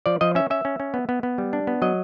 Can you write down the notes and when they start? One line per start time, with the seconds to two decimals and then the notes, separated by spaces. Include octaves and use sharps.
0.06 F3 D5
0.21 F3 D#5
0.35 C#4 E5
0.50 C#4 E5
0.65 C#4
0.80 C#4
0.94 B3
1.09 B3
1.23 B3
1.38 G3
1.53 D4
1.67 B3
1.82 F#3 D#5